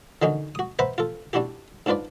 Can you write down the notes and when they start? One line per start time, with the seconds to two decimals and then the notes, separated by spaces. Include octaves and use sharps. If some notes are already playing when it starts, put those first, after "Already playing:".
0.22 D3 D#3 C#4 D#4 F#4
0.55 F#4 D#6
0.79 B4 C5 E5 F#5 A#5 B5
0.98 F4 A4
1.33 G3 D4 E4 F#4 G4
1.86 G#2 D4 F4 B4 D5